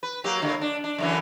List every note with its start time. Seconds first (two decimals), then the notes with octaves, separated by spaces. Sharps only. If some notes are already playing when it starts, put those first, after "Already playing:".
0.03 B4
0.24 F#3 A#3 G4
0.42 A2 D3 A#3
0.61 D4
0.84 D4
0.98 F#2 D3 E3